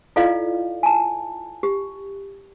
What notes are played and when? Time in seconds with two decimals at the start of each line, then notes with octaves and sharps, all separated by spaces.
0.16 E4 F4 A4 D5 D#5 F5
0.83 G#5 A5
1.63 G4